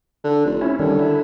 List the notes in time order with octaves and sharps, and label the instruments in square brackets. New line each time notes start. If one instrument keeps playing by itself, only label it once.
[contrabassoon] D3
F1
[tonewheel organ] C#4 E4
[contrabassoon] D3 [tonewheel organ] D#3 G3 C#4
[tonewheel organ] E4